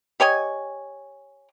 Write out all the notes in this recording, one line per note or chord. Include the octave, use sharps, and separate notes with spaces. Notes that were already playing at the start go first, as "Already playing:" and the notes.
G4 C#5 D#5 G#5